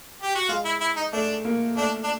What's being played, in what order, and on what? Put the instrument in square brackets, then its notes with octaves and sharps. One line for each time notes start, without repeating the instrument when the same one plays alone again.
[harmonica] G4
F#4
[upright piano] G#3 [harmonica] F4
[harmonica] E4
E4
D#4
[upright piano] A3 [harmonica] D4
[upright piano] A#3
[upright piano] A3 [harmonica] D4
[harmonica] D4